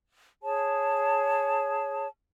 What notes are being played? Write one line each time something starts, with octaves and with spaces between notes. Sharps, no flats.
G#4 C#5 A5